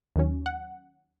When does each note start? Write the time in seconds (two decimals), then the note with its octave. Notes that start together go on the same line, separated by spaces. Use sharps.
0.16 D#2 D#3 F#3 C#4
0.46 F#5